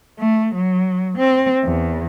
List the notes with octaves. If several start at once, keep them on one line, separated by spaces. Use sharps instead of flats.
A3
F#3
C4
E2